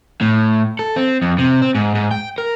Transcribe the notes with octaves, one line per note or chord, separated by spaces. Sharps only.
A2
A4
C4
F2
C3
C4
G#2
G#2
G5
A#4